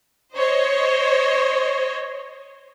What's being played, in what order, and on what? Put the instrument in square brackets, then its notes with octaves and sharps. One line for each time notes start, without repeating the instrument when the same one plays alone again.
[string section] C5 C#5 D#5